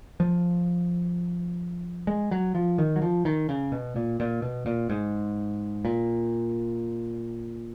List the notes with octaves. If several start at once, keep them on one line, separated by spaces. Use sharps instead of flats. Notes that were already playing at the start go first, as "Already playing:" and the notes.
F3
G#3
F#3
F3
D#3
F#3
F3
D#3
C#3
B2
A#2
A#2
B2
A#2
G#2
A#2